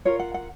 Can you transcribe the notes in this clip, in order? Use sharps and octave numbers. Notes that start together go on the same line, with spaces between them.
F4 A#4 C#5
F#5
F#5